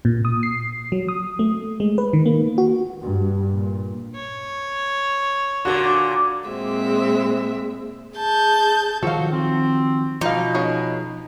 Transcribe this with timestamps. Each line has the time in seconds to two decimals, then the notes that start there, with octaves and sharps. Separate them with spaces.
0.05 A#2
0.25 D#6
0.43 C7
0.92 F#3
1.08 D#6
1.39 A3
1.80 G#3
1.98 B4
2.13 D#3
2.26 A#3
2.58 F#4
3.03 G2
3.51 A#2
4.15 C#5
5.65 A#2 D3 F#4
6.47 A#2 G#3 C4 E5
8.15 G#4 A5 G6
9.03 D#3 F3 F#3 F#4 A4 F5
9.32 C4
10.21 B2 F3 D#4 D5 F5
10.54 B3 C#4 G#4